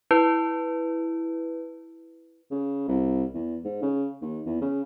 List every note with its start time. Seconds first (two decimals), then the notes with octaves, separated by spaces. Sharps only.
0.11 E4 B4
2.51 C#3
2.88 C2
3.34 E2
3.64 G#2
3.82 C#3
4.22 D#2
4.46 E2
4.62 C#3